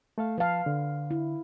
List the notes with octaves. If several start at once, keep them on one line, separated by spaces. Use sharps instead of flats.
A3 A4 F5
F3 B4 F5 A5
D3
E4